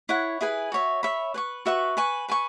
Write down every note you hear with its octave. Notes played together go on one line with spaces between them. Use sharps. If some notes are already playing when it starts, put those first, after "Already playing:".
E4 C#5 F#5
E4 G#4 B4 G#5
F#4 C#5 E5
C#5 E5 B5
B4 G#5 C#6
F#4 B4 E5 C#6
B4 G#5 C#6
B4 G#5 C#6